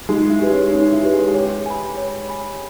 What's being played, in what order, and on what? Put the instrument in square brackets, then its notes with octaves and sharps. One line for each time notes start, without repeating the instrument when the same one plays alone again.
[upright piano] G#3 [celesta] D#4
[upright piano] E4
[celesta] G4 B4
[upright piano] C#4
[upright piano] C#4 [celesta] D#4
[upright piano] E4
[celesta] G4 B4
[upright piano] G#4
G#4
[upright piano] G4 [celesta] C#5
[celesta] G#5 B5
C#5
G#5 B5